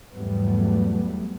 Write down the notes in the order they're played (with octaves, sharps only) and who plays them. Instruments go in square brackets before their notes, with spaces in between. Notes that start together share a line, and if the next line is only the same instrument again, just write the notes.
[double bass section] E2 G#2 F#3 G3 A3 B3